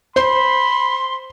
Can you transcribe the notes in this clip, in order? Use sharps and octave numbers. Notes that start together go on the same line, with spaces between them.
C5 B5 C6